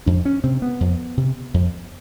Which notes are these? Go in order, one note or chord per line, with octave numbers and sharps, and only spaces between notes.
F2 D4
C#4
C3 C4
B3
F2
C3
F2